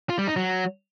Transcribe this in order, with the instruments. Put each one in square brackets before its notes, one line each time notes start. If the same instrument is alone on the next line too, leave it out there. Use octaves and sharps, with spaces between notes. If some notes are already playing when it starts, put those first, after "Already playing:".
[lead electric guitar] F4
G3
D#4
F#3